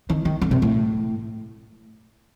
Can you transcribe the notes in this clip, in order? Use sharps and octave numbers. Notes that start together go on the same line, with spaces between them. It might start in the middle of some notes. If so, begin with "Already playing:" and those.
D#3
D#3
D3
C3
A2